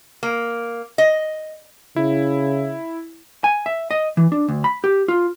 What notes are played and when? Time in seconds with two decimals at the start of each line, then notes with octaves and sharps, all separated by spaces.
0.23 A#3
0.98 D#5
1.96 C#3 E4
3.44 G#5
3.66 E5
3.91 D#5
4.17 E3
4.32 D4
4.48 D2
4.64 B5
4.84 G4
5.08 F4